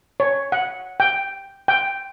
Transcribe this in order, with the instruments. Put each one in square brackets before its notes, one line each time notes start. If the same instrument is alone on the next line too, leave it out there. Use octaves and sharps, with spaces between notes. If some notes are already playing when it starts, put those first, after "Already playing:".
[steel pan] C#5
F#5
G5
G5